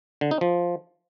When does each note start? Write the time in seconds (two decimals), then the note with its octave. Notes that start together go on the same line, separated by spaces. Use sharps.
0.21 D3
0.31 D#4
0.41 F3